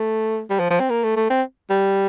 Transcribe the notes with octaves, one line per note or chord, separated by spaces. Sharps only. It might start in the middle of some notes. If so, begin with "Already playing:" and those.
Already playing: A3
G3
F3
F3
C4
A#3
A3
A3
C4
G3